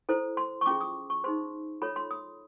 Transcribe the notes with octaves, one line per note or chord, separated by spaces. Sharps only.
E4 A4 C5
C6
C#6
C#4 F4 G#4 D6
D#6
C#6
D#4 G#4 C5 C6
F4 A4 C#5 B5
C6
D#6